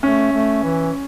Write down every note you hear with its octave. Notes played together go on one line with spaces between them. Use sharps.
A3 C#4
A3
E3